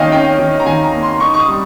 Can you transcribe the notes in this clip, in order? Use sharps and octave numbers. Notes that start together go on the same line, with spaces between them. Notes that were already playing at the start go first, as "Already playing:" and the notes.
Already playing: D#3 A#3 C#4 D#5 F5 G5 G#5
C#4 G5
D#3
A#5
D#3 G#5
A#5
A#3
C6
D#4 C#6
C#6
D#6
G3